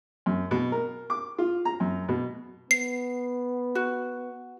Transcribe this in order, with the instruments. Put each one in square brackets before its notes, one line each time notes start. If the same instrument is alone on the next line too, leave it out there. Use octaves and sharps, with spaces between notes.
[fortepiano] F#2
B2
A#4
D6
F4
A#5
F#2
B2
[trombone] B3 [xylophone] C7
[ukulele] F#4